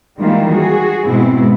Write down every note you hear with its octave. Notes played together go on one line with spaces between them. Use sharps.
D#3 E3 G3 G#3 A#3 F4
F#4 G#4
G#2 B2 G#3 B3 C4 E4